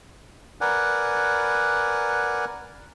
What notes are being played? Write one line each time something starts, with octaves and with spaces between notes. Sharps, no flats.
A#4 B4 D5 F#5 G#5